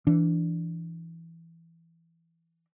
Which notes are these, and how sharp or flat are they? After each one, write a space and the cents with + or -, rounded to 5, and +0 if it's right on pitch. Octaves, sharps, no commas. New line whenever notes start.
E3 +10 D4 +0